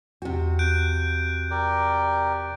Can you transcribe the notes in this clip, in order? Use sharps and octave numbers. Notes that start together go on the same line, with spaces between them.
E2 C3 F#4
F#6 G6 D7
G4 A#4 D5